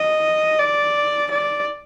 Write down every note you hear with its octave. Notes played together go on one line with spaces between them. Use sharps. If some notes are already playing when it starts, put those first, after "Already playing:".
Already playing: D#5
D5
D5